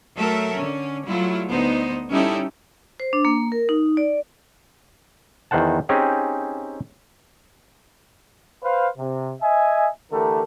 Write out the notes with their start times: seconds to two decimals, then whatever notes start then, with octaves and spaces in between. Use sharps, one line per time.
0.18 F#3 A3 A4 A#4 E5
0.54 D3 C#4
1.06 F#3 G3 A3 E4 F4
1.50 D2 B3 D#4 C5
2.10 G3 C#4 D#4 E4 G4 A4
3.00 C5
3.13 D4
3.25 A#3
3.52 A#4
3.69 D#4
3.97 D5
5.51 E2 D#3 C5 F#5 A5
5.89 C4 C#4 D#4 G4 G#4
8.64 B4 C5 F5
8.98 C3
9.42 D#5 E5 G#5
10.11 D3 E3 A3 G4 A4 A#4